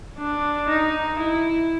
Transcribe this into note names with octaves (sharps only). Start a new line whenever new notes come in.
D4
D#4
E4